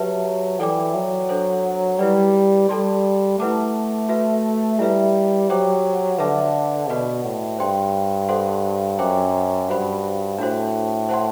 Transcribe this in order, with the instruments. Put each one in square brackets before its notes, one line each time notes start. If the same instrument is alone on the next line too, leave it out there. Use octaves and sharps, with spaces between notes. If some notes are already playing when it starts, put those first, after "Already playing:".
Already playing: [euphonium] F#3 [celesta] G4 B4 E5 A5
[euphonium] E3 [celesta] A4 D5 G5 D6
[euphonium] F#3
[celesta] D4 A4 C5
[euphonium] G3 [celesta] E4 G4 B4 D5
[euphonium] G3 [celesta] A4 D5 A5 C6
[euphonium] A3 [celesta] E4 B4 F#5 A5 D6
[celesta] F#4 B4 E5
[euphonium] G3 [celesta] E4 B4 E5
[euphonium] F#3 [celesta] G4 C5 G5 D6
[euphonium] D3 [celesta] B4 E5 A5 D6
[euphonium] B2 [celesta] F#4 B4 D5
[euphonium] A2
[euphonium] G2 [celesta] C5 G5 C6
[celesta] A4 C5 F#5 C6
[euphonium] F#2 [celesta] C5 G5 D6
[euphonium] G2 [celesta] F#4 C5 F#5 B5
[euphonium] A2 [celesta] D4 F#4 C5
[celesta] C5 F#5 A5 C6